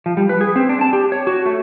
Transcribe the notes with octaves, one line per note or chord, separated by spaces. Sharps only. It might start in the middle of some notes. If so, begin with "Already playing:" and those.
F3
G3
B4
G#4
C4
D4
A5
G4
C#5
F#4
A3